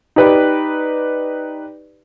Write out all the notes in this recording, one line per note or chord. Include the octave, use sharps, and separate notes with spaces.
D#4 G4 B4 D5